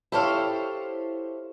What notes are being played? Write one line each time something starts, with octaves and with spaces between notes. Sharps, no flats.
E4 G4 A4 C5 C#5 F5